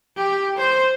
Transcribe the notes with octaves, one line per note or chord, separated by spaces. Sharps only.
G4
C5